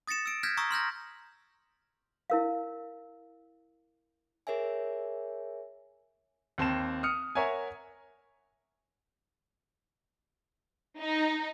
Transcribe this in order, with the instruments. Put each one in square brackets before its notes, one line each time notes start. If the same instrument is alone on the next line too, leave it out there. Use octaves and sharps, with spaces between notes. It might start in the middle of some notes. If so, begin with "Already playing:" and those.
[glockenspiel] D#6 A6 A#6 C#7 E7
E6 D7
F6 G6 G#6 A#6 B6
A#5 C#6 D#6 E6
C6 F6 G6 A#6
[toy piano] E4 A#4 F5
[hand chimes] G#4 A#4 C#5 E5 G#5
[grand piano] D#2 C4 A5 E7
D#6 F6 C#7
A#4 C#5 E5 F#5 G#5
[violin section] D#4